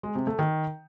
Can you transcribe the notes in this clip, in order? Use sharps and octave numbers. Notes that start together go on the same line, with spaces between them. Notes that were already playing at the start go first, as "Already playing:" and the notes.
G#3
C3
A3
D#3